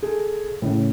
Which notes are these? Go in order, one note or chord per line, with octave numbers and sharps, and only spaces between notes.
G#4 A4
A2 C#3